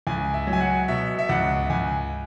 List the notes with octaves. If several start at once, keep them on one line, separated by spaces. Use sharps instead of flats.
C#2 G#5
E5
F#3
G#5
F#5
B2 E5
E5
C#2 F#5
C#2 G#5